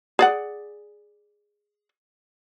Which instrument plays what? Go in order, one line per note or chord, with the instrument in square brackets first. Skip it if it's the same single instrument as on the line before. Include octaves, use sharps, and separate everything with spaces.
[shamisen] G#4 D5 F#5